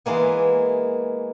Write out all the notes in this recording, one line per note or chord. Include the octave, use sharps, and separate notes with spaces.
E3 G#3 A#3 B3